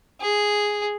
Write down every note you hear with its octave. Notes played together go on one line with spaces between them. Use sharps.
G#4